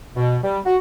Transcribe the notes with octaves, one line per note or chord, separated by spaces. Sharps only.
B2
G3
F#4